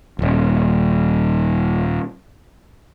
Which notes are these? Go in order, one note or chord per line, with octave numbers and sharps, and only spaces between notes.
D#1 G#1